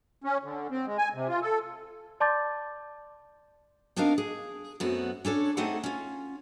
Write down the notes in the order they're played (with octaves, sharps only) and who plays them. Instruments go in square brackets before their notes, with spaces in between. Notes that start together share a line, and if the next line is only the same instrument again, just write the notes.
[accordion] C#4
D3
C4
G#3
G#5
C3
F4
A4
[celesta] D5 A5 C6 D6 G6 A6
[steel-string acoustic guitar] B3 C4 D4 D#4 A#4 F5
G#4
F#2 A3 B3 C4 F#4
C#4 D4 A4 C#5
A3 C4 D#4 G#4 A4 F#5
C#4 F4